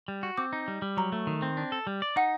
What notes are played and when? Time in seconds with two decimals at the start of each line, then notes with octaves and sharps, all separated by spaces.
0.08 G3
0.23 F#4
0.38 C4 D6
0.53 D#4
0.68 G3
0.82 G3
0.97 F#3 A#5
1.12 A3
1.27 D#3
1.42 C4
1.57 D4
1.72 A4
1.87 G3
2.02 D5
2.16 D#4 F#5